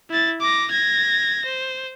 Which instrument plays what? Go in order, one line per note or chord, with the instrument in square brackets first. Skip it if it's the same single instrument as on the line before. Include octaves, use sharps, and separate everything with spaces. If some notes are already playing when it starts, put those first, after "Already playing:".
[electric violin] E4 A6
D6 A#6
G#6 A#6
C5